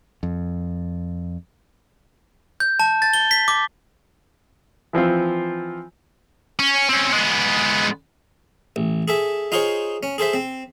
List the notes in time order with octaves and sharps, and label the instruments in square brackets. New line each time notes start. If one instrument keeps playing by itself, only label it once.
[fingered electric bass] F2
[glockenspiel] G6
A5
A6
G7
B6
D6
[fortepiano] E3 F3 C4 F4
[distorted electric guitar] C#4
C4 C#4
G#3 B3
[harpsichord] A1
G#4 A4 E5
D#4 F4 G#4 C5 C#5
C#4
G#4 A4 C5 E5
C4